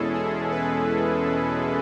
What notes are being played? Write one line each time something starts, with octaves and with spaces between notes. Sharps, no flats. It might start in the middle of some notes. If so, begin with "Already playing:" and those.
Already playing: E2 B2 G#3 C#4 E4 G#4 A4
G#4
B4